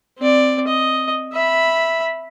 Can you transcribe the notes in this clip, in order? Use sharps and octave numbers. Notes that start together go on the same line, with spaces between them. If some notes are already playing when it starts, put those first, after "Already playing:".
C4 D5
D#5
E5 B5